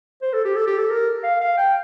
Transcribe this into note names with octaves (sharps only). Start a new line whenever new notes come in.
C5
A4
G4
A4
G4
A4
A#4
F5
F5
G5